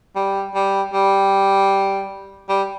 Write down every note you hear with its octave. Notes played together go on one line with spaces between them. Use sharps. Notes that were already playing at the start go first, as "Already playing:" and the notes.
G3
G3
G3
G3